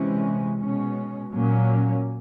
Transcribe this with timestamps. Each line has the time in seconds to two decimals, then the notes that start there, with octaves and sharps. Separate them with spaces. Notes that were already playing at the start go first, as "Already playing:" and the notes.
Already playing: C3 E3 G#3 C#4
0.58 B2 G#3 C#4
1.32 A#2 F#3 A#3 C#4